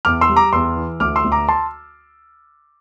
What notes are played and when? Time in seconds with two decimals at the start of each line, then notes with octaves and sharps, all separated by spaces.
0.05 E2 D6 F6
0.21 C6 E6
0.29 G3
0.36 A#5 D6
0.53 E2 C6 E6
0.76 E3
1.00 D2 D6 F6
1.16 C6 E6
1.25 D2
1.32 A#5 D6
1.48 A5 C6